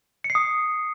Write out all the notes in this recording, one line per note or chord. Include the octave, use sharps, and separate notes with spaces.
C#7
C7
D#6